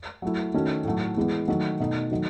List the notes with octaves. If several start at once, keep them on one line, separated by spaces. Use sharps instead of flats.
F#3 A3 E4
D#3 A3 C#4 F#4
A2 F#3 A3
E3 G#3 B3
D#3 F#3 A3
B2 A3 D#4
D#3 F#3 A3